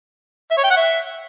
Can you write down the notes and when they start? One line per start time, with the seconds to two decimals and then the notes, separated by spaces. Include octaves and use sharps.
0.51 E5
0.57 C#5
0.64 G5
0.70 F#5
0.77 E5